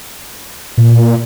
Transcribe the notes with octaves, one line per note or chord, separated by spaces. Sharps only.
A#2